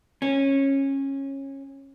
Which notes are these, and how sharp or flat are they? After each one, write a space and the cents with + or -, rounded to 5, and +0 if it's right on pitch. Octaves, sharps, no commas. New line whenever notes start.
C#4 -20